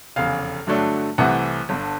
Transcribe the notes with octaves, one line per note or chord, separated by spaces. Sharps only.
F1 E2 C#3 F5
G2 D3 F#3 A3 D4
C2 C3 E3 A3 F#5
G1 G2 D3